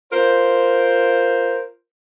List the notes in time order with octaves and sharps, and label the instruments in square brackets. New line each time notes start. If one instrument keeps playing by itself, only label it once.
[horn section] F4 A#4 C5